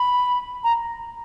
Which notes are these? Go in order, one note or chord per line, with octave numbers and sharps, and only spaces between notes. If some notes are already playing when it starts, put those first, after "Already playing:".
Already playing: B5
A#5